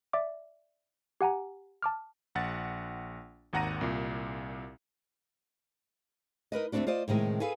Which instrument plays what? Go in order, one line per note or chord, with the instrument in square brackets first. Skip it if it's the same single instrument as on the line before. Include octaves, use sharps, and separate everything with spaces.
[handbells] D5 E5 D6
G4 F#5 G#5 A#5
A5 D6 F6
[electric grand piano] A#1 F#5 A6
G#1 D#2 F#5 A#5 A#6 D#7
C2 A#2
[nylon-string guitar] D#4 A#4 B4 D#5
D2 A3 A#3 C4 D4 F#4
F4 C5 D5 D#5
A2 C3 D#3 G#3
G#4 A4 B4 F5 G#5